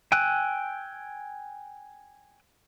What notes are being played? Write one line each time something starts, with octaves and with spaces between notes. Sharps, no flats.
G5 G#5 E6 F#6